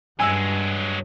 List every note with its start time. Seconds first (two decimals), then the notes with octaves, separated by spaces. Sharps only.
0.20 G2 F#3 G#3 G#5 E6